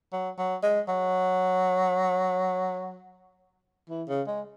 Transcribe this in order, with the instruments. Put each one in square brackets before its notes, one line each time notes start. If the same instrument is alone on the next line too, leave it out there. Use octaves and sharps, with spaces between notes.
[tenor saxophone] F#3
F#3
G#3
F#3
E3
C#3
G#3